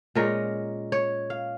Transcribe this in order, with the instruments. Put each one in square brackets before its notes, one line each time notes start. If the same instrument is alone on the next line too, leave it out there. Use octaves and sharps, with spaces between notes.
[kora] A#2 G#3 C#4 A#4
C#5
F5